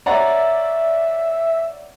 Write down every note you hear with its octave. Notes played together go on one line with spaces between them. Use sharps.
C#5 D5 E5 F#5 A#5